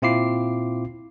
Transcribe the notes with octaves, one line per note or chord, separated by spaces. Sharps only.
A#2 C4 E4 F4 D6 C7